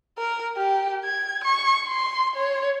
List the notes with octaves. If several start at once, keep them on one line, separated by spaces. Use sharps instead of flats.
A#4
G4
G#6
C#6
C6
C#5